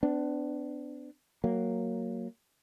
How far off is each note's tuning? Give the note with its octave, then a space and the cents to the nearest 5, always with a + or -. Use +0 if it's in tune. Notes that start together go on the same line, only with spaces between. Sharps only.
B3 +40 D4 +0
F#3 +0 A#3 -10